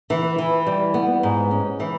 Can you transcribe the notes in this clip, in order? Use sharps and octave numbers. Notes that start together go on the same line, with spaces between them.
E3
E3
G3
B3
G#2
C#4
E3